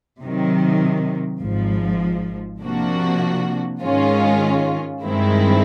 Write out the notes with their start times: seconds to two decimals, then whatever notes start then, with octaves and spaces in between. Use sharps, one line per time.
0.21 C3 D#3 F#3
1.41 G#1 G#2 F3
2.61 C3 F3 A#3 D4 F#4
3.81 G#2 D#3 G#3 C#4 F4
5.02 G2 D#3 G#3 C4 E4